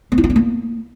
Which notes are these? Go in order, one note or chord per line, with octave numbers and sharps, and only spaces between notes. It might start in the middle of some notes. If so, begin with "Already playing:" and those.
B3
E4
F4
D4
A#3